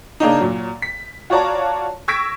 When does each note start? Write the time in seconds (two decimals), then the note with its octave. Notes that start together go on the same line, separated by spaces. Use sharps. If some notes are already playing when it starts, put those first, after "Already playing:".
0.20 C#3 A#3 D4 D#4
0.40 A#2 F#3
0.82 B6
1.30 F4 F#4 C#5 D5 A5 A#5
2.08 C#6 E6 G#6 A#6 B6 D7